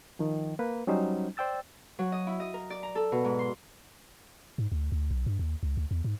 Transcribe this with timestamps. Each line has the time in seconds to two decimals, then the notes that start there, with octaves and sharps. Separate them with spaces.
0.19 D#3 F3
0.59 A#3 B4
0.87 F#3 G3 C#4 D#4 C5
1.37 C5 D5 G5 E6 A6
1.99 F#3
2.12 D#5
2.27 E4
2.40 D#5
2.54 A#4
2.70 D5
2.83 A#5
2.95 A4
3.12 B2
3.24 G#2
3.39 C6
4.58 G#2
4.72 D2
4.92 D2
5.11 B1
5.26 G2
5.39 D#2
5.63 C#2
5.77 D2
5.91 E2
6.04 G#2